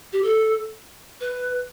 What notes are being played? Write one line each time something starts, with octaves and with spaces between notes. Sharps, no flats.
G4
A4
B4